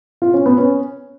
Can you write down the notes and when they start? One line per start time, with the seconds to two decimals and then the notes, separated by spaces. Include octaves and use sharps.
0.22 F4
0.34 C#4
0.46 B3
0.58 C#4